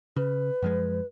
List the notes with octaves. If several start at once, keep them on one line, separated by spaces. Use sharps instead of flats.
C#3 B4
F#2 F3 G#3